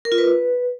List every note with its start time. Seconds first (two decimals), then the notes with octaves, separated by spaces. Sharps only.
0.05 A#4
0.12 F4
0.18 B4